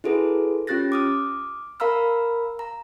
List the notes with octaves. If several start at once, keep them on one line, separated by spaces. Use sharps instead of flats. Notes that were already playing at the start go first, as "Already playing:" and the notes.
E4 F#4 G#4 A4 B4
C#4 F4 G4 F#6 A6 A#6
D6 D#6 F6
A#4 F5 A#5 B5 E6 F6
A#5